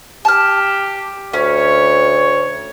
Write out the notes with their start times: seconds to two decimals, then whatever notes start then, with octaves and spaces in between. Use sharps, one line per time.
0.25 G4 A5 F6
1.33 D2 C#4 C#5